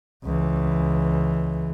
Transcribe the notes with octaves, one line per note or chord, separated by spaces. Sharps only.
C#2 E3